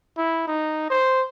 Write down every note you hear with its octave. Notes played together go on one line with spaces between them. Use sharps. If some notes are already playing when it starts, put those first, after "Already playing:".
E4
D#4
C5